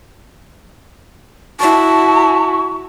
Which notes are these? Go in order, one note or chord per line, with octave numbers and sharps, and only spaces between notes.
E4 F#4 A5 C#6